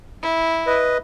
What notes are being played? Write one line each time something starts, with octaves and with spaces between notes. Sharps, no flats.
E4
B4 D#5